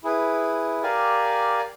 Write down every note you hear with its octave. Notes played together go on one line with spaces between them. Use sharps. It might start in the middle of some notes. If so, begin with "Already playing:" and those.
E4 G#4 B4
G4 A#4 D5 F5 G#5